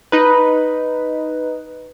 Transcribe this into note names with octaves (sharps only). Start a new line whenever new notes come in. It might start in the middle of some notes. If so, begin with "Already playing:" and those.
D#4 B4